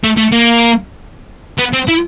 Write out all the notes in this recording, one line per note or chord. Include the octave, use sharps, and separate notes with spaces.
A3
A3
A#3
B3
C4
E4